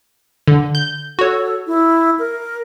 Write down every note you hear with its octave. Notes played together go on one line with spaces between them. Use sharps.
D3
G6
F#4 A4 C#5
E4
A#4